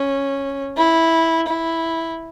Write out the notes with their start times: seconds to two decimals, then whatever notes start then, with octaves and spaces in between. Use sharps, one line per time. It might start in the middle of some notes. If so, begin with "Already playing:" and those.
Already playing: C#4
0.77 E4
1.48 E4